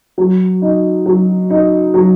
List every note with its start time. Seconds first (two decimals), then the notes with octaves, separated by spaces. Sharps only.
0.18 F#3
0.62 D#4
1.06 F#3
1.50 D#4
1.94 F#3